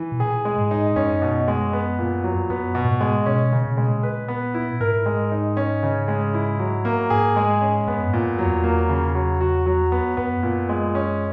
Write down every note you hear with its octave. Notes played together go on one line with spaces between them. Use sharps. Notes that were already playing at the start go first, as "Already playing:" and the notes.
Already playing: E3
B2
A#2 G#4
G#3
G#2
D#4
F#2 C#4
B2
G#3
B3
A#2
F#3
F#2 B3
B2
A#2
G#2
G#3
B2 C#4
C#3
A#2
B2 G#3
A#2
B4
B3
E4
G#2 A#4
G#3
D#4
C#4
C#3
G#3
E4
F#3
A#3
G#2 G#4
G#3
C#4
F#2 B3
G#2
A#2
F#2
F#3
E2
A#3
C#3
F#3
F#4
F#3
B3
F#2 B3
A#2
G#3
C#4